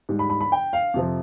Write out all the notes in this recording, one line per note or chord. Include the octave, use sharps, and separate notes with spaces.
G#2 G3
B5
B5
B5
G5
F5
F2 C3 F3